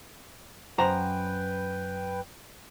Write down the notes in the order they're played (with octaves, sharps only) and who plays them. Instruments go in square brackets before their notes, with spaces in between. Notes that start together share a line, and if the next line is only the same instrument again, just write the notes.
[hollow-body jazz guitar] F#2 C5 F#5 [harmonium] B4 G5 [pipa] A#5